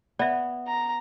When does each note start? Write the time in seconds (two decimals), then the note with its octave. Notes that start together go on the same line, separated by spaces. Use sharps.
0.19 B3 D5 E5
0.68 A#5